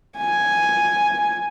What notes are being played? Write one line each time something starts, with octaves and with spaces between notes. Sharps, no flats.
G#5